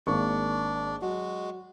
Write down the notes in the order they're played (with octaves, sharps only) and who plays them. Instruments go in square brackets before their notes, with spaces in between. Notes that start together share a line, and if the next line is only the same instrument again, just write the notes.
[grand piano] G#1 A#3 C#6 [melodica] D4
[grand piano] F#3 [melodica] G#3 F#4